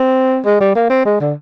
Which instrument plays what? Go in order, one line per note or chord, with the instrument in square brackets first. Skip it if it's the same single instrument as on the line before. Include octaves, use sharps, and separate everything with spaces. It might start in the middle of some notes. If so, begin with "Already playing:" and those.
Already playing: [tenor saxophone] C4
G#3
G3
A#3
C4
G#3
D3